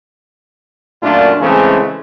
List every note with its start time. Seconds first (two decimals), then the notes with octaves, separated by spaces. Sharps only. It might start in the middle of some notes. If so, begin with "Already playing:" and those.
1.02 F#2 A#2 A3 D4 F4
1.40 C#3 E3 G#3 A3 C4 C#4